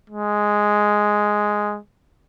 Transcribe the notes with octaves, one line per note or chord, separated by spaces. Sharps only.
G#3